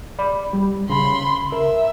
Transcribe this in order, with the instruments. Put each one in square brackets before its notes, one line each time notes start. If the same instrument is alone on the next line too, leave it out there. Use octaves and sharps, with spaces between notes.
[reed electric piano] D5 B5
G3
[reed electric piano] C#3 [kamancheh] B5 C6
[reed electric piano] A#4 [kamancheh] E5